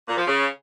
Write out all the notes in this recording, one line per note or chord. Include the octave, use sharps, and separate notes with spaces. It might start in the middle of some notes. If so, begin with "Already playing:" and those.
A#2
F3
C#3